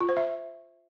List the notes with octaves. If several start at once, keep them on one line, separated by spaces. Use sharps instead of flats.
F4
C5
E5